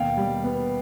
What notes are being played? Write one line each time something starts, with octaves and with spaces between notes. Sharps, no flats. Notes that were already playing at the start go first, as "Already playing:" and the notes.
Already playing: D#2 B2 F5 G5
G3
B3